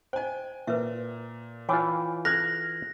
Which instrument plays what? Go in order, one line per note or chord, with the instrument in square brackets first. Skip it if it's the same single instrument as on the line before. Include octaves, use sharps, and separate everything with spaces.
[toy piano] C5 D#5 [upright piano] G5 G#5
[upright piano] A#2 [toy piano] B4 E5
[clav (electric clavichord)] E3 F4 [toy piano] C#5 G5 G#5
[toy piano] A4 [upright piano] F6 F#6 G#6 [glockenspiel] A#6